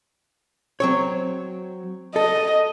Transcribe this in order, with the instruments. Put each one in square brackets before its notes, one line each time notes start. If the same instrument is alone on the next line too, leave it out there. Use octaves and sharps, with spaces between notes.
[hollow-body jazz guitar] F#3 C4 C#5
[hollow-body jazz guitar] A4 [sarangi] D#5